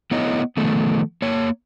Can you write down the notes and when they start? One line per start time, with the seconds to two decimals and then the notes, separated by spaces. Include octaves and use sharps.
0.11 A3 B3 E4 C#5 D#5
0.57 D#3 F3 A3 B3
1.22 A#3 C#5